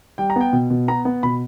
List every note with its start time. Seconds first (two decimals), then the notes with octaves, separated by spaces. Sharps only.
0.18 G3 G5
0.30 A#5
0.36 B3 G5
0.53 B2
0.71 B2
0.88 B3 A#5
1.05 B3
1.23 B2 B5